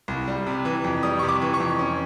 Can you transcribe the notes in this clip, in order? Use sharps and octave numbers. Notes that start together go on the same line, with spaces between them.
C2
G3
C3
E3
F2
G3 D#6
C3 C#6
D6
E3
C#6
F2
C#4